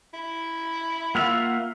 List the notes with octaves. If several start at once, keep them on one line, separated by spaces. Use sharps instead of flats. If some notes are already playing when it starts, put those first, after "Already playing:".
E4
A#3 F4 E5 F#5 F6 F7